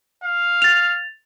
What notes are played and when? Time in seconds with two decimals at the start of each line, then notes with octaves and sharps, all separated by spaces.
0.24 F5
0.62 A6 F7